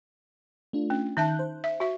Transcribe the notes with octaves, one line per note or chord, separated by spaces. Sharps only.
A3 D4 F4
C#4
D#3 D#4 E5 A5 F#6 G6
C5
E5
F#4 E5